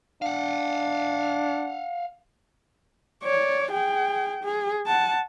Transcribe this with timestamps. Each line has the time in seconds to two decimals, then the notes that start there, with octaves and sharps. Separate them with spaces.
0.22 D4 F5 F#5
3.23 C#5 D5
3.72 G#4 G5
4.43 G#4
4.87 F#5 A5